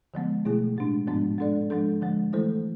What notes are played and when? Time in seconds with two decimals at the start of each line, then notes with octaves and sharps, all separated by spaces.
0.14 D3 F3 G#3 B3
0.45 B2 A3 E4 G#4
0.77 A2 G#3 D4
1.07 G#2 F3 G#3 B3 D4
1.38 G#3 D4 A4 D5
1.70 F3 G#3 D4 A4
2.01 D3 F3 G#3
2.33 E3 A3 E4 A4 C5